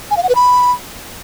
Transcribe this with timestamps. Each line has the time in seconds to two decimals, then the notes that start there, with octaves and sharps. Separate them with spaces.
0.11 G#5
0.17 F5
0.23 F#5
0.29 B4
0.35 B5